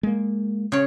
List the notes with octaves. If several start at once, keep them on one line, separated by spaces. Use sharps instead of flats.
G#3 A#3
C#3 C#5